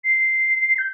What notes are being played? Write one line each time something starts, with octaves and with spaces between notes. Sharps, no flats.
C7
G6